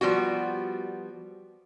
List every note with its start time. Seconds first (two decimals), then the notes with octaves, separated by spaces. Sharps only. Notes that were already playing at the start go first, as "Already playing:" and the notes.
0.01 F3 G3 B3 F#4